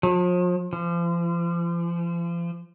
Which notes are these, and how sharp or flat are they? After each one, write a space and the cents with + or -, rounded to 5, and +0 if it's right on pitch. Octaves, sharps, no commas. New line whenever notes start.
F3 +40
F3 -35